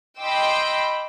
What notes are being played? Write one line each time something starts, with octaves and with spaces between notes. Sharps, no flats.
D#5 G5 B5 C6 D6 E6